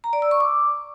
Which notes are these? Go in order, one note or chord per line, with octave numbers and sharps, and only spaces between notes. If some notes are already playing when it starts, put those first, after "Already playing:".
A#5
D5
E6
C#6
D6